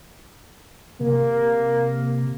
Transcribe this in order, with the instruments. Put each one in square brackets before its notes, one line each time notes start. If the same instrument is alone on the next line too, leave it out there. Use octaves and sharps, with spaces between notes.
[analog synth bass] C3 [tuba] A#3